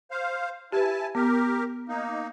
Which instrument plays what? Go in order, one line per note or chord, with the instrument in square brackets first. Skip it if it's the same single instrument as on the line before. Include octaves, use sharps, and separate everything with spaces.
[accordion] C5 F5
[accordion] E4 G#5 A5 [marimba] G4 B4
[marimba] B3 [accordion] G4 A#4
[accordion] A#3 D#4